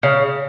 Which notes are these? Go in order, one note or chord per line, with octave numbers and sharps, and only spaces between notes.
C#3